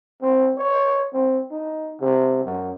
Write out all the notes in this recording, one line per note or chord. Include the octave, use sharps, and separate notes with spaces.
C4
C#5
C4
D#4
C3
F#2